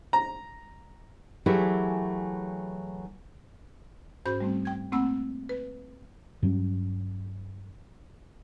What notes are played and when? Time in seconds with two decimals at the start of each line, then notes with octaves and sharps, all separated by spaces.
0.13 A#5
1.46 E3 F#3 A3 E4 G4 G#4
4.26 G#2 C#4 F#4 C5 B5 G6
4.40 G3 A3 C4
4.65 G5 G#6
4.92 A3 A#3 C4 F#5 B5 E6
5.49 B4
6.42 G2 F#3 C#4